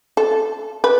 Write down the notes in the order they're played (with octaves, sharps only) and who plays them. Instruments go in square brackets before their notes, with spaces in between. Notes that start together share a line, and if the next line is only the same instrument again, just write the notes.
[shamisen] A4
B4